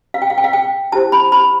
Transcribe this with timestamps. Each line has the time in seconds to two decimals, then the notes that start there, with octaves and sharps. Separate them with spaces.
0.14 F5
0.22 G5
0.30 F5
0.38 G5
0.44 F5
0.53 G5
0.92 E4 G4 C5 A5
1.12 B5
1.32 B5